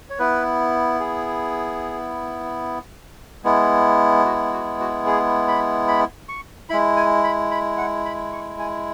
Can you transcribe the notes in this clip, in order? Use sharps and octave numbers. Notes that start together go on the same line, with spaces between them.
C#5
B3 E4 B4
G#4
G#3 B3 E4
F#4
F#4
F#4
G#4
B5
B5
C#6
G#3 E4 B5
G#5
B5
B5
F#5
B5
C#6
G#5